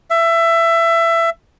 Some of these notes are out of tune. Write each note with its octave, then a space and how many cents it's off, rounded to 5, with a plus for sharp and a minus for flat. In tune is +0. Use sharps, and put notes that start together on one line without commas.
E5 +20